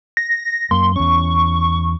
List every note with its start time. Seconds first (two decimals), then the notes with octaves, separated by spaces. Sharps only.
0.17 A#6
0.71 F#2 A#3 C6
0.96 E2 C#4 C#6